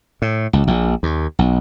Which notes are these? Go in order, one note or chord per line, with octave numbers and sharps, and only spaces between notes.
A2
C#2
A#1
D#2
B1